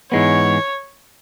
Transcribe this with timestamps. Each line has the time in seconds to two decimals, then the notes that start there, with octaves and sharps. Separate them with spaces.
0.12 G#2 E3 G#3 B3 C#5